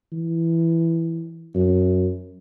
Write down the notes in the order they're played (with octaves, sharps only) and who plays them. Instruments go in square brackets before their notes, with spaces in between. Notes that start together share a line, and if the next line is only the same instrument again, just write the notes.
[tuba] E3
F#2